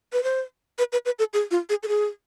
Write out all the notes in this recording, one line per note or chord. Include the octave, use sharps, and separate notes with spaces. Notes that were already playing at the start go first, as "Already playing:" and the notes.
B4
C5
B4
B4
B4
A4
G#4
F4
G#4
A4
G#4